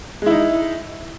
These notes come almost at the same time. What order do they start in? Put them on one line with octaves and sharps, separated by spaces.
G#3 E4 D#4